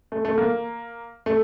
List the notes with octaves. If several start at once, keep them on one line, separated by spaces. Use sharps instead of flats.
A3
A3
A#3
A3